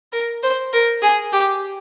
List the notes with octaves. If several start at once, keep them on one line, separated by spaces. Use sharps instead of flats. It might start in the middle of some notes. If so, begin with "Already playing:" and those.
A#4
C5
A#4
G#4
G4